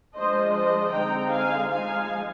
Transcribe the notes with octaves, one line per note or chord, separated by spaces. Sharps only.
F3 G#3 D4 C5 D#5
C5 D#5
D3 G#3 C4 D#4 G5 A#5
F5 G#5
F3 G#3 D#4 F5 G#5